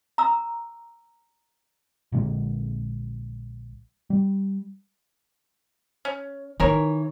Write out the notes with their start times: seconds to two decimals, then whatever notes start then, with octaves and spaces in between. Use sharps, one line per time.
0.18 A#5 E6
2.12 A#1 D3 G#3
4.10 G3
6.05 C#4
6.60 D#3 E3 D#4 A#4 C#5